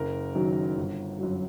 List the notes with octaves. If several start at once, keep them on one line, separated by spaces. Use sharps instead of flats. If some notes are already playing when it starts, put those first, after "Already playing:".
Already playing: F#1 A#4
F#2 D#3 F#3
G1
F#2 F#3